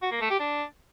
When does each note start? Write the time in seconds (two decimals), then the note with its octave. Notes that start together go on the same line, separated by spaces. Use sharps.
0.02 F#4
0.11 A#3
0.21 A3
0.30 G4
0.39 D4